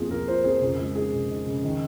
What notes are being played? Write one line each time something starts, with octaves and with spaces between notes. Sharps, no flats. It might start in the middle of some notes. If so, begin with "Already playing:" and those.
Already playing: F2 A#3 F4 G#4
F2 A#4
F4 C5
F2 G#4
C#3 A#4
G#3 G#4
D#4 G#4
C#3
D#4
C#3
D#3